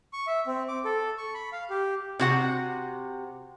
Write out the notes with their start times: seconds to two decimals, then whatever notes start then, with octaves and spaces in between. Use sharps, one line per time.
0.13 C#6
0.27 E5
0.47 C4
0.68 D6
0.85 A4
1.18 C#6
1.34 B5
1.52 F5
1.70 G4
2.19 C3 F#4 F#5